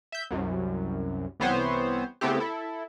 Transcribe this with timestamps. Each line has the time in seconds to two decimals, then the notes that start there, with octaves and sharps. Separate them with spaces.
0.12 E5 G6
0.31 C2 F#2
1.40 C2 E3 B3 C4 C5 C#5
2.21 C#3 A3 B3 C4 E4 G4
2.40 E4 A4